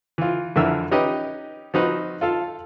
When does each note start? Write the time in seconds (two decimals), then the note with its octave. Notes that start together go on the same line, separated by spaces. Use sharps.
0.18 E3 F4
0.56 F2 D3 E3 A#4 E5 E6
0.91 C#4 D#4 G4 B4 D#5
1.74 F3 C4 D#4 F#4 B4
2.21 F4 A4 F5